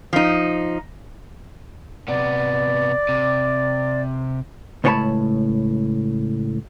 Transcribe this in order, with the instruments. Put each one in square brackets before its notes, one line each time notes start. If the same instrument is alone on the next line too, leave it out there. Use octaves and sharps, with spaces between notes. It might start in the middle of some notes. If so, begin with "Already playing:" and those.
[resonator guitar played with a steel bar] F3 D#4
[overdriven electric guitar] C3 B3 [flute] D5
[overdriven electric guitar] C3
[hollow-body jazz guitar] C#2 A2 B3 C#5 A5 B5